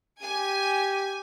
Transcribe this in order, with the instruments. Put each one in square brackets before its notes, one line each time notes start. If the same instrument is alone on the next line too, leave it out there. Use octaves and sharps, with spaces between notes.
[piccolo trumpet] G4 [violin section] G#5